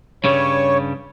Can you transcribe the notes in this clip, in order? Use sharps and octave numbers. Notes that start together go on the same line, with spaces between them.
G2 C#3 G3 C#5